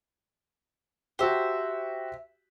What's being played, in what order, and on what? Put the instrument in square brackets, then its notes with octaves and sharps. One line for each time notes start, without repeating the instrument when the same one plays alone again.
[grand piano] F#4 G4 [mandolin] C5 E5 A5